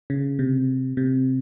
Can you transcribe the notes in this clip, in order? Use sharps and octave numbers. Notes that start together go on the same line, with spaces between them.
C#3
C3
C3